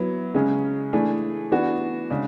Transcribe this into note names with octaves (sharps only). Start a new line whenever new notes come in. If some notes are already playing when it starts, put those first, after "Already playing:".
Already playing: F#3 B3 E4
C#3 G#3 C#4 G#4
E3 A3 D4 G#4
E3 B3 D4 F#4
C#3 G#3 D4